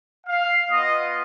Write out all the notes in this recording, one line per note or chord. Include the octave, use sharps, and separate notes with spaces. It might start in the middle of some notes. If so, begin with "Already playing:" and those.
F5
B3 F4 D#5